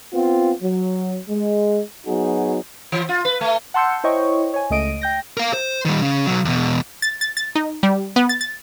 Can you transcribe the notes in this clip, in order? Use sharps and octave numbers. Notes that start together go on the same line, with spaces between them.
B3 C4 F4
F#3
G#3
F#3 B3 D#4 F#4 G#4
E3
F4
B4
A3
F#5 A5 C6 E6 G6 C#7
E4 C5 C#5 D#5 G5 C#6
C#5 G#5
C#2 A3 D#5 D7 D#7
G5 G6 A#6
A#4 F5
C5
D#3 G3
C#3
B1 F#3
E2 B2
A6
A6
A6
D#4
G3
B3
A6
A6